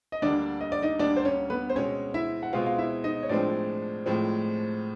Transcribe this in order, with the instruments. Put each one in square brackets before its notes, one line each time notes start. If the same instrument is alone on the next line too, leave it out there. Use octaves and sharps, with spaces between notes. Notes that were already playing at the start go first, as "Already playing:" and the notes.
[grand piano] D#5
[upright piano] D2 D3 G3 A#3 [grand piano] D4 D5
[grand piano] D#5
D5
D#4 D#5
[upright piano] D2 D3 G3 A#3 [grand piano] D4 D5
[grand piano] C5
C#4 C#5
B3 B4
C5
[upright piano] B2 G#3 C4 [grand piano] C#4 C#5
[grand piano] E4 E5
F#5
[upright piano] B2 G#3 C4 [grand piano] F4 F5
[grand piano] F5
E4 E5
D#4 D#5
C#5
[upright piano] A2 F3 G#3 C4 [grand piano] D4 D5
[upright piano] A2 F3 G#3 C4